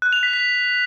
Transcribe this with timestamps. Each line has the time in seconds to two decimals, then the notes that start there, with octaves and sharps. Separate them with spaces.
0.02 F#6
0.13 F7
0.23 B6
0.33 B6